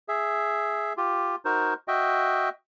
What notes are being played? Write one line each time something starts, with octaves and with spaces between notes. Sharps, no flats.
G#4 E5
F4 G4
D#4 F#4 A#4 C5
F#4 D#5 E5 G5